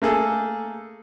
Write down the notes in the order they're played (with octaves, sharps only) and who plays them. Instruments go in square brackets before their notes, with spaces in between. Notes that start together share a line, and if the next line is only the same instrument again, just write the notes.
[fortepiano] A3 A#3 G#4 A4